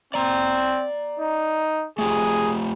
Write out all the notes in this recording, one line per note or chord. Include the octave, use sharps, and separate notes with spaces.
C4 D5 A#5
D#4
A3 F4 G4 G#4